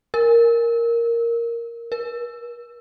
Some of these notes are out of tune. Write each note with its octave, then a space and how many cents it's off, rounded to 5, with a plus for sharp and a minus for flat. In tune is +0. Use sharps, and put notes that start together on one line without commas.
A#4 +0
A#4 +40